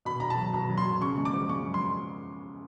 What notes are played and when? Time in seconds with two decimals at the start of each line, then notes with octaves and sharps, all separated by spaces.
0.05 B2 B5
0.20 B2 A#5
0.30 A5
0.37 F#3
0.53 B2 A#5
0.69 F#3
0.78 C6
0.85 B2
1.01 C#3 C#6
1.17 G#3
1.25 D6
1.33 F3
1.49 G#3 C#6
1.65 F#2
1.74 C6